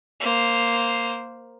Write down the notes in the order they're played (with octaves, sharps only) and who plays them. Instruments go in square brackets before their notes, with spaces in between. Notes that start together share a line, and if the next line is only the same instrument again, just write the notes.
[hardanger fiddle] A#3 C5